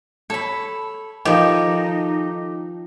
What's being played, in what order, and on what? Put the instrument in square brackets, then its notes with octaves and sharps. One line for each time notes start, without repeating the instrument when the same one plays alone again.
[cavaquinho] A4 B5 [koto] C#5
[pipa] D#3 [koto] F3 [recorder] D#4 [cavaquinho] G4 A4